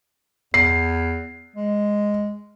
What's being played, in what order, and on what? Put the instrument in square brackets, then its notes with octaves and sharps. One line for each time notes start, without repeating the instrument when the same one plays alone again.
[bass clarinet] E2 [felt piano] C7
[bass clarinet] G#3